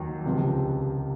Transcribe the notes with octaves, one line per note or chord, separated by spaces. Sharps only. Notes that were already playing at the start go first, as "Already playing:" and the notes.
Already playing: D#2 D#3 F#3
C#2 C3 F3